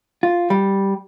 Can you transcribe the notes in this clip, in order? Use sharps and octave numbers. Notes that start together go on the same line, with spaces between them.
F4
G3